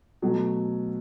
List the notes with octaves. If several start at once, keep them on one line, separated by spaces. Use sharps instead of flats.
B2 F#3 A3